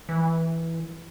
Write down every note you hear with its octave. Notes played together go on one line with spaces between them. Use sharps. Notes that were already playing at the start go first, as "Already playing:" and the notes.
E3